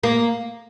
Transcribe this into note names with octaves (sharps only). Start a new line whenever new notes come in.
A#3